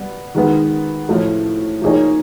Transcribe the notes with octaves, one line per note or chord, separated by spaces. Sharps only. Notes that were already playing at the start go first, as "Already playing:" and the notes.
Already playing: G3 B3
D#3 G#3 B3
A2 F3 A3
F3 A#3 D#4 G#4 C#5